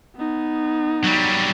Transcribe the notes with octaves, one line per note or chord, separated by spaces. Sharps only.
B3 D#4
F#3 G3